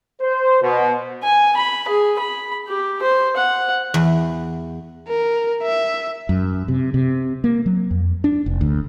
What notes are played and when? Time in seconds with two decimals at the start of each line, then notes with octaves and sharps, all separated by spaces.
0.21 C5
0.62 B2
1.24 G#5
1.57 B5
1.88 G#4
2.19 B5
2.68 G4
3.02 C5
3.36 F#5
3.94 E2
5.08 A#4
5.62 E5
6.29 F#2
6.68 C3
6.94 C3
7.44 A#3
7.66 F#3
7.91 F2
8.24 D4
8.46 F1
8.61 D2